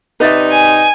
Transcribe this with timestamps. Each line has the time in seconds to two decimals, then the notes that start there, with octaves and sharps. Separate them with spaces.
0.20 C3 D#4 B4 D5 E5
0.52 G#5